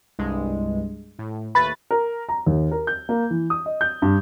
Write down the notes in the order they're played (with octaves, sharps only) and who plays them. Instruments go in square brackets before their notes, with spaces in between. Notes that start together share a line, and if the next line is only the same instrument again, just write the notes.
[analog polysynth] C2 G2 G#3
A2
[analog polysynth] D#2 A3 B4 [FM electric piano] B5 A6
[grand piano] A#4
A#5
D#2
A#4
G6
A#3
E3
D#6
D#5
G6
G2